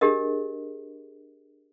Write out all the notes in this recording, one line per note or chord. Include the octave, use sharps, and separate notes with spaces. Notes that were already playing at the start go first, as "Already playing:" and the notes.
D4 G4 G#4 A#4 D#5